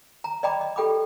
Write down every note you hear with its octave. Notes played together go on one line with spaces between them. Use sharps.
A#5
D5 D#5 G5 A#5 B5 D6
D#5
G4 A4 G5 B5 D6